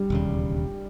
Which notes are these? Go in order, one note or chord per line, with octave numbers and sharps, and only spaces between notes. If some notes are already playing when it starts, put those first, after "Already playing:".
Already playing: G3
E1 D#2 C#3